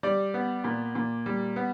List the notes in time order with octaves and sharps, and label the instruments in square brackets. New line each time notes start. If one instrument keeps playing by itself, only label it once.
[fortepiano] G3 D5
B3
A#2
A#2
G3
B3